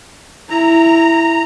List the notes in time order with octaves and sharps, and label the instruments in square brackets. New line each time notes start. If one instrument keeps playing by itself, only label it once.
[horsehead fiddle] E4 [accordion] A#5